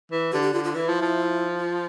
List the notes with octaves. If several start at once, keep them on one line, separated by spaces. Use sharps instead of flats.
E3
D3 G4
G4
D3 F4
F4
E3 E4
F3
F3
F4